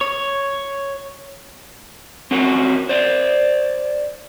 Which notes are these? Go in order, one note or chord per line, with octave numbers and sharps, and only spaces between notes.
C#5
C4 C#4 F#4 A#4
C5 D5